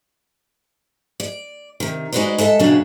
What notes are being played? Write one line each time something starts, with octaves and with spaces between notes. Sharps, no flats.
D5
C3 D#3
G#3 D#4 F#4 B4 C5 D5
G#3 A4 E5 A5
F#2 A#2 C#3 F#3 B3 D4